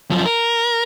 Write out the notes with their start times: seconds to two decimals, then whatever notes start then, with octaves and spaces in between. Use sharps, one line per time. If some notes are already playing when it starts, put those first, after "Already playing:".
0.10 F#2 F3
0.26 A#4